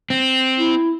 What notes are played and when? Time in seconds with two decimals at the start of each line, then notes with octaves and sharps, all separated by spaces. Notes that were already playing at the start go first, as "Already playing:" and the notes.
0.10 C4
0.58 E4